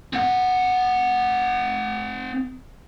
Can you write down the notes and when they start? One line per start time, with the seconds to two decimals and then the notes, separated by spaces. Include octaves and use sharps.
0.13 C4 F#5